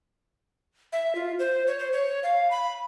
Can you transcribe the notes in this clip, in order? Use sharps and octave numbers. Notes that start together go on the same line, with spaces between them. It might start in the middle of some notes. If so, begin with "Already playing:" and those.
E5
F4
C5
C#5
C5
C#5
F5
B5